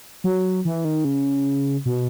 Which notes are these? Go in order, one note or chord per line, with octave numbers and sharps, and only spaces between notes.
F#3
E3
D#3
C#3
B2